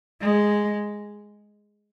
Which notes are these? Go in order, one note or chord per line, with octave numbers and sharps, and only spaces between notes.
G#3